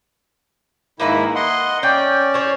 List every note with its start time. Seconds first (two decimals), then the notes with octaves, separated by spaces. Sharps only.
1.00 G#2 D#3 A#3 E4 B4 A#5
1.35 D#5 F#5 C6
1.83 C#4 D5 G5
2.34 C5 C#5